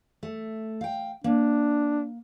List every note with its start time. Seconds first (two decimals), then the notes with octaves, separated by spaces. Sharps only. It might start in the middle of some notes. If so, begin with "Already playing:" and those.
0.23 A3
0.81 F5 G5
1.24 A#3 D4